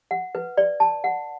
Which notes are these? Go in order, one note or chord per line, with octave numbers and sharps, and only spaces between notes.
F#5
B4
D5
A5
F#5